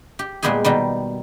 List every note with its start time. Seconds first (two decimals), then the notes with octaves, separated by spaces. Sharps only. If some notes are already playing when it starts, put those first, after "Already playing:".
0.19 G4
0.43 A#2 G3 G#3 B3 G4 G#4
0.64 B2 D#3 G3